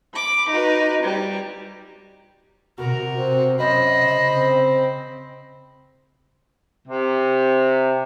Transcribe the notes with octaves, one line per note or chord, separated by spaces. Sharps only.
B5 D6
D#4 F#4 B4
G3
C3 F#4 A#4
C4 F#4
F#2 C5 D#5 B5
C#3
C4
C3